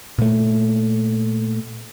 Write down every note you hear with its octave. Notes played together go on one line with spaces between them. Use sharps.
A#2 A3